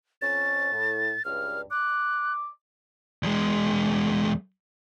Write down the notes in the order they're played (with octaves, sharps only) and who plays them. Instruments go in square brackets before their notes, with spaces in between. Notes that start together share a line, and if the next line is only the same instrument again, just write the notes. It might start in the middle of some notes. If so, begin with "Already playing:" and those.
[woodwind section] F2 C#4 [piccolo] A6
[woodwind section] A2
[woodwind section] C#2 G2 [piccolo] F6
[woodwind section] D6 [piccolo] F#6
[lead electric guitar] E2 G#3